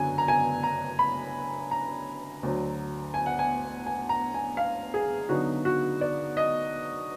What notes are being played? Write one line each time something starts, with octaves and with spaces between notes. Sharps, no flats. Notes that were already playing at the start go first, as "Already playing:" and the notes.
Already playing: F#2 D3 F#3 G#5
A#5
G#5
A#5
B5
A#5
D2 D3 F#3
G#5
F#5
G#5
G#5
A#5
G#5
F5
G#4
D3 F#3 B3 D#4 F#4
F#4
D5
D#5